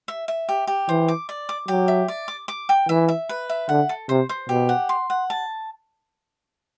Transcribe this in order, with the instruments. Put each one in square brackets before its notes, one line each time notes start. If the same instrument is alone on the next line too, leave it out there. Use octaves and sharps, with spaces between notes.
[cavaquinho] E5
E5
G4
G4
[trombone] E3 [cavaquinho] C5
[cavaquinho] D6
D5
D6
[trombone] F#3 [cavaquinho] G4
[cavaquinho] E5
D5
D6
D6
G5
[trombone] E3 [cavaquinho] E5
[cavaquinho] E5
B4
E5
[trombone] D3 [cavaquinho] F#5
[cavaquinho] A4
[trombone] C3 [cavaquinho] C5
[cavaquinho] C5
[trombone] B2 [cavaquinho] G4
[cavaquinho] F#5
C6
F#5
A5